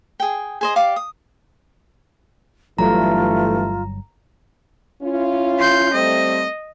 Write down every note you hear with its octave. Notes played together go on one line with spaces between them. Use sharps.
G#4 G5
G#4 C5 D#5
G4 D5 F5 D6
D#6
G1 G2 E3 F#3 G3 A3 F4 A#5
C#4 E4 F4
C6 G6
G3 A3 C4 D#5